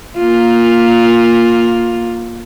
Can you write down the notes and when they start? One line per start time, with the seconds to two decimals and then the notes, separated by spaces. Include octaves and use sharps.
0.17 A#3 F4